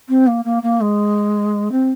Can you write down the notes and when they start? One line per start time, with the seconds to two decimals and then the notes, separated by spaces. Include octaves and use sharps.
0.09 C4
0.27 A#3
0.45 A#3
0.63 A#3
0.81 G#3
1.71 C4